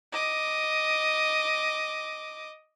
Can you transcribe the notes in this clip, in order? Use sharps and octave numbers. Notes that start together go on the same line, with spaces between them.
D#5 D6